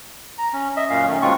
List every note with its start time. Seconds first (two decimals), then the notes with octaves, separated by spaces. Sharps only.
0.38 A#5
0.53 C#4
0.76 D#5 E5
0.90 F#2 A#2 C#4 F5
1.08 D#3 A3 C#4
1.22 D#2 B2 G#3 C4 F4 C#6